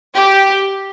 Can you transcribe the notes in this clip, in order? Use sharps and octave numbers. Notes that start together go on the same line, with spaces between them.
G4